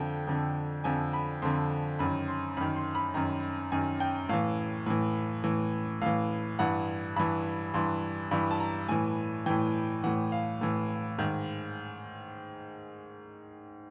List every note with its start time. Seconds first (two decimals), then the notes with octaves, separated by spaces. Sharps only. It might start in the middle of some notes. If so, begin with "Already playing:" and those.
Already playing: F2 D3 G5
0.27 F2 D3
0.84 F2 D3 G#5
1.13 B5
1.42 F2 D3 C6
1.99 F#2 D#3 B5
2.28 C6
2.57 F#2 D#3 B5
2.76 C6
2.95 B5
3.14 F#2 D#3 A#5
3.72 F#2 D#3 G#5
4.00 G5
4.29 A2 E3 F5
4.86 A2 E3
5.44 A2 E3
6.02 A2 E3 F5
6.59 G2 E3 F#5
7.16 G2 E3 B5
7.74 G2 E3 C6
8.31 G2 E3 B5
8.51 A5
8.60 A#5
8.88 A2 E3 G#5
9.46 A2 E3 G5
10.04 A2 E3 F#5
10.32 F5
10.61 A2 E3
11.19 G#2 D#3